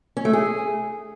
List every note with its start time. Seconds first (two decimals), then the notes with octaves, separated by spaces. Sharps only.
0.17 C#4
0.25 A3
0.33 G#4